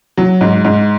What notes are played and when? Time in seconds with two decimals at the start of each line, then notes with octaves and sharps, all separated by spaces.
0.17 F#3
0.41 G#2
0.64 G#2